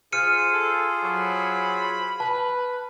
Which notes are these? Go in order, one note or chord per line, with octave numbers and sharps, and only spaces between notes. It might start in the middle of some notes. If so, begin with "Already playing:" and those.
F4 G#4 C5 F6 C#7 D#7
A4
F#3 B5
B4 A5